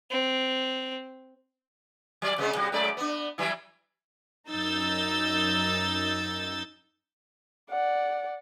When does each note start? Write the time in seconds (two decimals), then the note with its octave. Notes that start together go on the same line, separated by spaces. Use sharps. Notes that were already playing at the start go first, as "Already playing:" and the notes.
0.10 C4
2.22 F#3 D5
2.38 C3 G#3 B3
2.55 C3 G3 F#4
2.72 F#2 G#3 D5
2.97 B3 D4
3.38 E3 F#3 E4
4.50 F#2 D#4 E6 G6 A6
7.70 D5 F#5